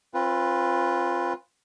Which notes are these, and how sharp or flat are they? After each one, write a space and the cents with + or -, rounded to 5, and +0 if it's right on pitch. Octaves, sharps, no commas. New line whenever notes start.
C4 +35 F4 +0 B4 +0